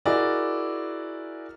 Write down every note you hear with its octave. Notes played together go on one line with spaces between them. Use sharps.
E4 F#4 G#4 A#4 D5 D#5